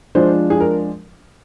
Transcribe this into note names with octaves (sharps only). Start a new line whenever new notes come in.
F3 G#3 D4 F4 C5
G#4
A#4